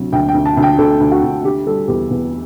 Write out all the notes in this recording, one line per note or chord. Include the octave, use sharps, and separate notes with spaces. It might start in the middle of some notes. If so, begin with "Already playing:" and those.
Already playing: D2 C3 F#3
D2 G5
G5
D2
A5
D2
G5
D2 A4
D2
F#4
D2
D3 G4
G3 A4
E2 G4
E2